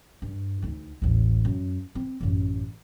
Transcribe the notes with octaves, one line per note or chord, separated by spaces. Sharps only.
G2
D2 D#4
A1 D#2
F#2
C4
A1 F#2